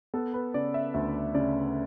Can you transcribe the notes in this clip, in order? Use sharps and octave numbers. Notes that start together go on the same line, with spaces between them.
B3 A4
B4
C#3 D5
E5
D2 E5
C#3 D5